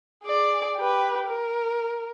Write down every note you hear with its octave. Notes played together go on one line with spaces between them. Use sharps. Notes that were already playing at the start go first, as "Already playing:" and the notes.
G#4 D5
G4 B4
A#4